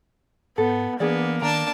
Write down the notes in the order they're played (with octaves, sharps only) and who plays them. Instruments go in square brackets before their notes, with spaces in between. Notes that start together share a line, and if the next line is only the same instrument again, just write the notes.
[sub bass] G#2 [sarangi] B3 [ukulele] A4
[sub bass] E3 [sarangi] A#3 [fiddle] B3 [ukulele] D4 G#4 D5
[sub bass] D#3 [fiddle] D4 A5 [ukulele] A#5